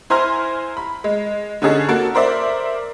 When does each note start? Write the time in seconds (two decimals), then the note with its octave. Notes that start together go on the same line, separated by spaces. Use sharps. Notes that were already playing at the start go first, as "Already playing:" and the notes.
0.10 E4 C5 G#5 A#5 C6 F6
0.77 B5
1.04 G#3
1.62 D3 C#4 D#4 G#4 A4
1.89 A#3 F#4 A4
2.15 A#4 C5 D5 E5